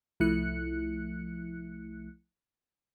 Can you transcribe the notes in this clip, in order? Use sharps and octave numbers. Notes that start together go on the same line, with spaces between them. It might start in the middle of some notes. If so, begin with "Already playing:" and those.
C2 F3 A3 E4 F#6 C#7